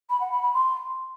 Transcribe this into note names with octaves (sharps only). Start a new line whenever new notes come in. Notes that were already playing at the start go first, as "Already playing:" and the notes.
B5
F#5
B5
B5
C6